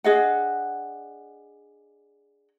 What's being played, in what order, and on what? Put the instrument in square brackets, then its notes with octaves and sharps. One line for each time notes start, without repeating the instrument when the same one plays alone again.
[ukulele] D4 G#4 D#5 F#5